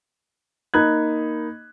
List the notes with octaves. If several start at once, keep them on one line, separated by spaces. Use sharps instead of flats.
A#3 D#4 B5 F#6 G#6